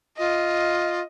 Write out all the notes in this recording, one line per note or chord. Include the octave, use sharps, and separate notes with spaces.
F4 D#5